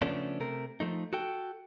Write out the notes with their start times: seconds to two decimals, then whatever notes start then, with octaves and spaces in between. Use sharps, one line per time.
0.02 C#3 F3 A3 B3 C#4 D4
0.40 C3 A3 A#4
0.80 F3 A3 D#4
1.13 F#4 A4 G5